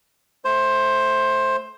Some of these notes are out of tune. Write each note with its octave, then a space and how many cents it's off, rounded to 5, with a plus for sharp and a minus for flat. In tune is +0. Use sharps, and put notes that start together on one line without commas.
A3 -10 C5 +15